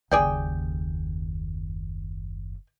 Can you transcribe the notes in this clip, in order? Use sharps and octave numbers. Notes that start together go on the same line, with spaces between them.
F#1 D#2 G#4 D5 G5